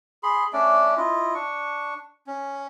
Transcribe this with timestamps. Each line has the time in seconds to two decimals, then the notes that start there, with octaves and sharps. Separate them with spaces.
0.23 G#4 B5 C6
0.53 A3 C#4 D4 D5
0.97 E4 F4 D#5
1.34 D4 C#6
2.27 C#4